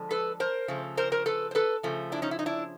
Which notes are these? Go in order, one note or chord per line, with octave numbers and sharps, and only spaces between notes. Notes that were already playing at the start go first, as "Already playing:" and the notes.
Already playing: D3 F3 G#3
A4 B4
A#4 C5
C#3 F3 A3
A#4 C5
A#4 C5
A4 B4
C5
A4 B4
C#3 F3 A3
D4 E4
C#4 D#4
E4
D#4
D4 E4